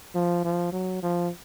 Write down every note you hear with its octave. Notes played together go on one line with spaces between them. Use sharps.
F3
F3
F#3
F3